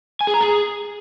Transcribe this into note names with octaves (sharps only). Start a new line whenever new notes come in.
G#5
G#4
A#5
G#4